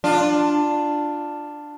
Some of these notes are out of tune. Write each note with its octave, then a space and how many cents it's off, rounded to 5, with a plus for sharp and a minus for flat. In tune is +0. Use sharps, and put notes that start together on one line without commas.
D4 +10 F4 +0